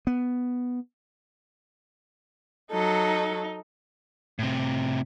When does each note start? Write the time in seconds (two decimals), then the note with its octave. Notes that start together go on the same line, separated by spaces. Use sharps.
0.07 B3
2.71 F#3 D#4 A4
4.39 A2 C3